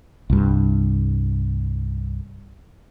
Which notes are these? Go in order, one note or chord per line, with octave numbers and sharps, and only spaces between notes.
C2 G2